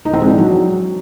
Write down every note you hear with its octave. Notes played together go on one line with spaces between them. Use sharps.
D#4
C4
G#3
D4
F#3